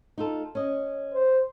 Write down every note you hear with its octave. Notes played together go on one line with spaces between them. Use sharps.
D#4 F4 A4
C#4 D#5
C5